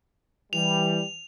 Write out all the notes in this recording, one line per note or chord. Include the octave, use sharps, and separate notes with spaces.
E3 G3 F7